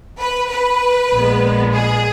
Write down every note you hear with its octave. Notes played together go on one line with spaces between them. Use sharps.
B4
B4
A#1 A#2 G#3 B3
G#4